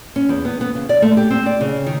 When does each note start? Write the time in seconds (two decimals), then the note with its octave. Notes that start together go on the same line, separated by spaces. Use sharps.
0.16 C#4
0.29 E2
0.45 B3
0.61 B3
0.75 C#3
0.89 D5
1.02 A3
1.17 G4
1.30 C4
1.46 D5
1.61 C#3
1.86 D#3